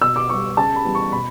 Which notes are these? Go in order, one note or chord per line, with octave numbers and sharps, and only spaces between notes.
B2 E6
D6
G3 B3 C#6
C#3 A5
B5
E3 G3 B3
C#6
B2 B5